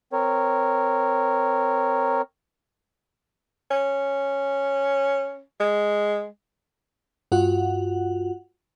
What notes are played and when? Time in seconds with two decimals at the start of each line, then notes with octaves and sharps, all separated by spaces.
0.13 C4 A#4 C#5
3.71 C#4
5.60 G#3
7.32 G2 F4 F#4 F#5